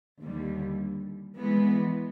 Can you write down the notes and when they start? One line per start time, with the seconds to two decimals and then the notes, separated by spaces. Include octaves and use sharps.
0.20 D#2 D3 G3
1.36 E3 G#3 B3